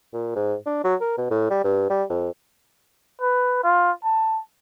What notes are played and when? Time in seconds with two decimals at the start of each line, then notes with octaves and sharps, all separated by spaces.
0.13 A#2
0.35 G#2
0.66 D4
0.84 F#3
1.01 A#4
1.18 B2
1.31 A2
1.50 G3
1.64 G2
1.90 G3
2.10 F2
3.21 B4
3.63 F4
4.03 A5